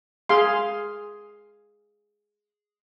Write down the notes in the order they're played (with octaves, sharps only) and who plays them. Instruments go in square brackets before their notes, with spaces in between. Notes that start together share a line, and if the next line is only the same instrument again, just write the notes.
[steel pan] G#4 F5 C6